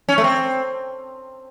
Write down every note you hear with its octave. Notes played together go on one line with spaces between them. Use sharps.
C#4
A3
C4